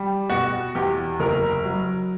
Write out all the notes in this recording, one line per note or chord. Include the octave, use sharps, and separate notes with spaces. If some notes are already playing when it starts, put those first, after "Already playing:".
Already playing: G3
B2 F#4
E2 G4
F#1 A#4
F#3